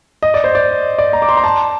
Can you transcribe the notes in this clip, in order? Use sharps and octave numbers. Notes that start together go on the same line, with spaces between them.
D#5
D5
C5
D5
D5
A#5
D6
C6
A#5
A5